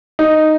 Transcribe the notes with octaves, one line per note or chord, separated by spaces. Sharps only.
D#4